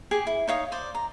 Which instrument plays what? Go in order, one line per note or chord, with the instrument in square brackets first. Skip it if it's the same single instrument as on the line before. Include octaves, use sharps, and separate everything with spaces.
[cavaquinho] G4 G#4 G#5
E4
D#4 C#5 F5 D#6
C5 D5
A#5